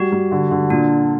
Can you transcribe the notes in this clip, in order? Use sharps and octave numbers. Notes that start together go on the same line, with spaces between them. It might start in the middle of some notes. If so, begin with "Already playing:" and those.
Already playing: G3 F#4
G3
D3
D3
A#2 D4